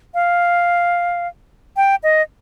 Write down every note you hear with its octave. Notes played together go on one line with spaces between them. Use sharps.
F5
G5
D#5